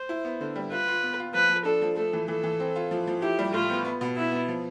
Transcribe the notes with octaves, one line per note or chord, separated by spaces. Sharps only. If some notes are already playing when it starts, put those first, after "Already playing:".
Already playing: C5
E4
B3
D3
G3
F4 B4
F4
B3
F4
F3 B4
F3
D4 A4
F3
A3 A4
E3
E3 A4
E3
C4
F4
F3
F3
E4 G4
G3
A2 F4
B3
B3
B2
B3 E4
B3
F3